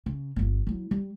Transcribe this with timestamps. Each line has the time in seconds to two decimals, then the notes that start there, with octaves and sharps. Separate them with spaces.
0.06 C#3
0.36 G1 F3
0.67 F#3 E4
0.91 G3